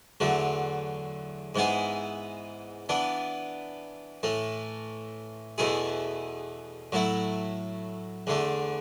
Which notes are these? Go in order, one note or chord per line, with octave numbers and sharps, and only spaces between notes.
E2 D3 F#3 A3
G#2 E3 B3 E4 G#4
E3 B3 D4
A2 E3 A3
E2 B2 A3 E4 G#4
A2 F#3 A3 E4
E2 D3 A3